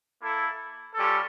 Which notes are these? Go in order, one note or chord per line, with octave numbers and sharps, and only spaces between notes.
A#3 E4 A4
G3 C#4 F4 A4